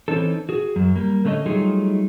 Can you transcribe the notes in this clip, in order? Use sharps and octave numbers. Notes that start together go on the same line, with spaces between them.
E3 C4 C#4 D#4 A4
F#4 G#4
F#2 F#3
G3 A#3
D3 A3 C#4 D4 D#5
F#3 G3 A3 D#4 F4 G#4